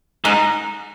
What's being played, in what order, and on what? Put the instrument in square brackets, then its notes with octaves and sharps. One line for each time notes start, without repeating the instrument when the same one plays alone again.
[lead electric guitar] G#2 [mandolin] D#4